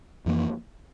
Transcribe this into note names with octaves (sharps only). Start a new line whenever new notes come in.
F2 E3 A#3